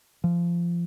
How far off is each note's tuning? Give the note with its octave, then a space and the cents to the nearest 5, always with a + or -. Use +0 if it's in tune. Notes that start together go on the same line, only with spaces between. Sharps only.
F3 -20